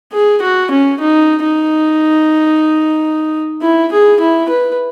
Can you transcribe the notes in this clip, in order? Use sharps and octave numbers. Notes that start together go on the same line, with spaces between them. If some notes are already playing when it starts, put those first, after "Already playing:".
G#4
F#4
C#4
D#4
D#4
E4
G#4
E4
B4